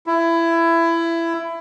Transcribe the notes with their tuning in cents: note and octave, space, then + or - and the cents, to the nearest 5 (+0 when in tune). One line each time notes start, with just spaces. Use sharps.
E4 +20